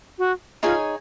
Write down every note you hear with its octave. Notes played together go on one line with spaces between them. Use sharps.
F#4
D#4 F4 G#4 C#5 G#5